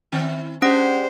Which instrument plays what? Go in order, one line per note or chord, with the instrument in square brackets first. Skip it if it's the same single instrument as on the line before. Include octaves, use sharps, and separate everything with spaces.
[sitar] D#3 C4 E4
[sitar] G#3 D4 G4 [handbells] C#4 F#5 [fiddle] C5